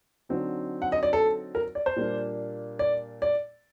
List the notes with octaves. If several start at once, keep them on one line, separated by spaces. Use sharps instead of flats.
D3 F#3 C4 D#4
F#5
D#5
D5
A4
A#4
D5
C5
A#2 G3 A#3 D4
D5
D5